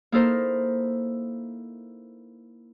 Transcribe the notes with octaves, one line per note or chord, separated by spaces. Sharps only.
A#3 D#4 E4 A4 A#4 C5